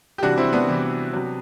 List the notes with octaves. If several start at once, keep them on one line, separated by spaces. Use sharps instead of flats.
G4
C3 E3 G3 D4 F#4
C4 E4
B3 D4
C3 E3 G3
C3 F#3